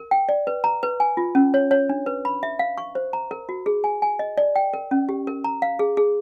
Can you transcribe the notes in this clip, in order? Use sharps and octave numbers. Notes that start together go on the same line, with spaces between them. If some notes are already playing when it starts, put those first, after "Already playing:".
Already playing: A#4
G5
D5
B4
A#5
B4
G#5
F4
C#4
C#5
C#5
D4
B4
B5
E5
F5
C#6
C5
A#5
A#4
F#4
G#4
G#5
G#5
D#5
D5
G5
A#4
C#4
G4
A#4
A#5
F5
G#4
G#4